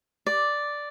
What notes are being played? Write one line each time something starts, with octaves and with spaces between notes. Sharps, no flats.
D5